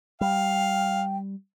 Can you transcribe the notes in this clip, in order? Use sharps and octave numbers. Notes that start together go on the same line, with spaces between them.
G3 F5 G5